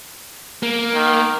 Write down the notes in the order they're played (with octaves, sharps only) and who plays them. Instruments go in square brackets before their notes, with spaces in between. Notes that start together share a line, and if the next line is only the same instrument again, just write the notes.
[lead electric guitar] A#3
[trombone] D#3